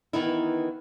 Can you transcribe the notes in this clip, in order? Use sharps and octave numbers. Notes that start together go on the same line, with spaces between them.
D#3 E3 B3 D#4 E4